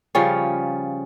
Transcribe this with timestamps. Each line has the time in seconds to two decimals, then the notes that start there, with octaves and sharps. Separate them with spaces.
0.15 C#3 F3 G3 C#4